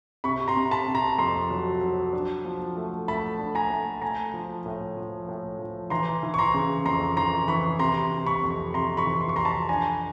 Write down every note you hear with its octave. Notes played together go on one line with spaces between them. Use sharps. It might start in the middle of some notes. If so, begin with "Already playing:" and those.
C3 B5 C#6
A#5 C6
C3
A5 B5
C3
A#5 C6
F2 A#5 C6
F#3
F#3
D4
F3
A3
A3 A5 B5
D4
G#5 A#5
A3
A3 G#5 A#5
F3
A2
F3
A2
F3
E3 A#5 C6
E3
C#6
A#5 C6
C#3
F2 A#5 C6
E3 A#5 C6
E3 B5 C#6
C3 A#5 C6
C3
B5 C#6
F2
C3 A#5 C6
B5 C#6
E3
C6
C#6
F2 A#5 C6
A5 B5
D4 G#5 A#5